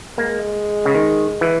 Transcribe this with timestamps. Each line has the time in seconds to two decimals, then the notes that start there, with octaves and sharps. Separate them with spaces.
0.18 G#3 A#3
0.85 C#3
0.95 D#3
1.41 E3